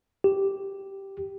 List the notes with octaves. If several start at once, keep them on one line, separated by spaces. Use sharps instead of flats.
G4